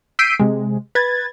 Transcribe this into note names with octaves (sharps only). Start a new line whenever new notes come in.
E6 G6 B6 C7 D7 D#7
C3 G#3
B4 G#6 A6